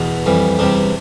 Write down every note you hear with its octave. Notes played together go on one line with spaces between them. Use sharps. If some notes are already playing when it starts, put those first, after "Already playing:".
Already playing: E2 B2 B3
F2 E3 G3
E2 C3 G3 D4